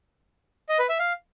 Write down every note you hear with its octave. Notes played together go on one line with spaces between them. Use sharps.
D#5
B4
E5
F5